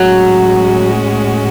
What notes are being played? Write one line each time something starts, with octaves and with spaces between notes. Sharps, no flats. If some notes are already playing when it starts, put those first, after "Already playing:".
Already playing: A2 F#3 G#3 C#4 F#4